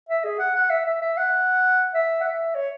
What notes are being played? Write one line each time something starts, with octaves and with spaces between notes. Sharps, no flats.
E5
G#4
F#5
F#5
E5
E5
E5
F#5
E5
F#5
E5
C#5